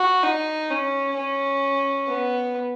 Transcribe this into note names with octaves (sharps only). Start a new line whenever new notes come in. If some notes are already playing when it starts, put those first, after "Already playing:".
Already playing: F#4
D#4
C#4
C#4
B3